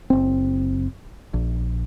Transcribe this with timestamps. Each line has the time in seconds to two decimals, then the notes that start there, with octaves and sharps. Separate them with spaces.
0.10 F#1 C4
1.34 A#1